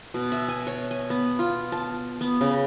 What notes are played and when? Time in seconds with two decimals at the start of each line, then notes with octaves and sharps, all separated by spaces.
0.14 B2
0.32 E5
0.48 G#5
0.67 C#5
0.91 G#5
1.10 B3
1.39 F4
1.72 A5
2.21 B3
2.41 C#3